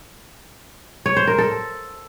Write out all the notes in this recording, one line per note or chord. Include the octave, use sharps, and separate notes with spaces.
C#5
C5
A#4
A4